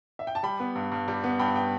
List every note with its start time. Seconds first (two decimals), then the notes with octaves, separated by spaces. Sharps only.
0.19 E5
0.27 G5
0.35 A5
0.43 G3 G5 B5
0.60 B3
0.75 G2
0.91 G2
1.08 G3
1.24 B3
1.39 G2 G5 B5
1.56 G5